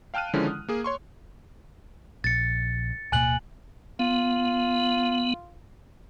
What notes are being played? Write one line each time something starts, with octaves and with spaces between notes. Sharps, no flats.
F5 G5 A5 F6 F#6 D#7
D3 D#3 F3 G#3 C#4 E4
D#6
A#3 G#4
C#5 C6 C#6
A#1 A6 C#7
D1 B2 A#3 G#5 F#6 F#7
B3 F4